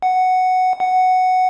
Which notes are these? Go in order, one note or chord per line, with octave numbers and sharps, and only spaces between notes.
F#5
F#5